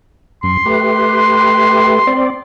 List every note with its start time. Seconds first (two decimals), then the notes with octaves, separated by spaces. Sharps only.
0.43 F#2 C6
0.66 A3 G4 B4
2.07 C4 D5